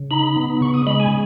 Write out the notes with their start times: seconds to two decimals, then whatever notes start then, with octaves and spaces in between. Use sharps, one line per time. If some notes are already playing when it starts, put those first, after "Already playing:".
Already playing: C#3
0.11 D#4 B5
0.36 B3
0.61 C#3 C#6
0.74 D#6
0.87 G#3 B5
1.00 G#5